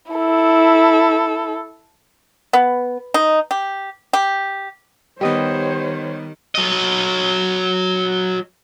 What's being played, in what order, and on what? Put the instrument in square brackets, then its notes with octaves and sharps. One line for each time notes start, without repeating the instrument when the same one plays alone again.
[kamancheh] E4 A4
[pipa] B3
D#4
G4
G4
[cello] D#3 [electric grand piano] G3 B3 [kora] G4 D#5 [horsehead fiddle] C5 C#5
[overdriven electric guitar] F#3 D#5